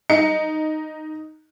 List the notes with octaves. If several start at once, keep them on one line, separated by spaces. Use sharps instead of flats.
D#4 C#7